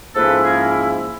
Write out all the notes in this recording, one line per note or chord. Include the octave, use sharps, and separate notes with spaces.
G#2 F3 A#3 C#4 E4 A4 B4
G#4 A#4